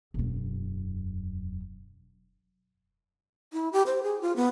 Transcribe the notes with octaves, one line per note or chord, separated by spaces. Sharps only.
E1 F#2
E4
G4
C5
G#4
F4
B3